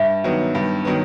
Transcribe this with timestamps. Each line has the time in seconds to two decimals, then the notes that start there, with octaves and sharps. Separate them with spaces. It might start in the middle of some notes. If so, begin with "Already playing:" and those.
Already playing: G2 E5
0.24 D#3 F#3 B3
0.55 G2
0.85 D#3 F#3 B3